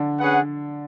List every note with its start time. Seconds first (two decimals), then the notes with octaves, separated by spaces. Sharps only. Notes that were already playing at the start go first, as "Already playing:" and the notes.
Already playing: D3 D4
0.19 C#4 G#4 B4 F#5